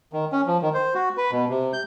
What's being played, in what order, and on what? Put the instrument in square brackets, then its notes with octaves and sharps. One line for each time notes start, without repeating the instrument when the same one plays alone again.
[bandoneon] D#3
C#4
F3
D#3
C5
F#4
B4
B2
C3
G6